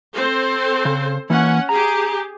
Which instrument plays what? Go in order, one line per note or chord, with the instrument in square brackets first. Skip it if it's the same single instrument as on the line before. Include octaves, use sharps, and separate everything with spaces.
[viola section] C4 A4 C5
[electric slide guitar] C#3
[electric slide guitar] E3 A#3 [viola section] C#4 F#5
[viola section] G4 G#4 [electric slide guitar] A#5